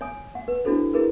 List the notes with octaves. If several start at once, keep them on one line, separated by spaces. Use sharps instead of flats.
C#5 G#5 D#6
F#5
B4
D4 E4 F#4 A4 C5
E4 G#4 A#4 B4